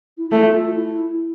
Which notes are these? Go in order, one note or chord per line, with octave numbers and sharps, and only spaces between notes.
E4
A3 E4
F4
F4
E4